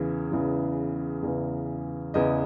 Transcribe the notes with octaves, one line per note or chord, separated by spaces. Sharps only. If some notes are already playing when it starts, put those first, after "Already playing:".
Already playing: E2 C#3 E3
E2 C#3 E3
E2 C#3 E3
E2 C#3 E3 D#5